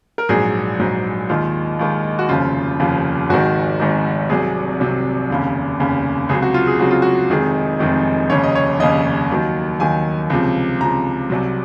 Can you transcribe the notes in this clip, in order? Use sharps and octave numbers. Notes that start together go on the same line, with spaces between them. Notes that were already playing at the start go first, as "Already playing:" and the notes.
A#4
A#1 G#2 F#3 G#4
A#1 G#2 F#3
D#2 D#3 G#3 F4
D#2 D#3 G#3
F#4
F1 D#2 C#3 F3 F4
F1 D#2 C#3 F3
G#1 G#2 D#3 F#4
G#1 G#2 D#3
C2 C3 F#3 G#4
C2 C3 F#3
F1 D#2 C#3
F1 D#2 C#3
C#2 C3 F#3 G#4
F#4
F4
G#4
C#2 C3 F#3 F#4
F4
F#4
F1 F2 D#3 G#3 G#4
F1 F2 D#3 G#3
F1 D#2 C#3 C#5
D#5
C#5
F1 D#2 C#3 D#5
D#2 D#3 F#3
D#2 D#3 F#3 G#5
C#2 C3 F3
C#2 C3 F3 A#5
C2 C3 F#3